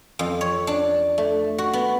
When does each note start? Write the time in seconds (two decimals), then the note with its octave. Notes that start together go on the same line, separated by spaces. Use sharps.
0.19 F2
0.41 C#5
0.67 D4
1.18 A3
1.58 F#4
1.73 B3